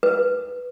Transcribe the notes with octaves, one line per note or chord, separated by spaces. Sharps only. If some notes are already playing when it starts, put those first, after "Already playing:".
B4